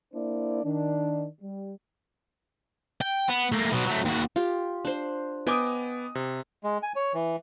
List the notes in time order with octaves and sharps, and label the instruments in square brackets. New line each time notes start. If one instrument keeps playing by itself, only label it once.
[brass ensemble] A#3 D4 E4 C5 D5
D#3 D4
G3
[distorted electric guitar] G5
B3
A3 A#3
B2 F#3
F#3 A3
D#2 F#4
[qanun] F4 G4
D4 C5
[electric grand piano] B3 D6 D#6 [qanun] D#5 G5 G#5
[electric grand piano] C3
[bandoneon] G#3
G#5
C#5
E3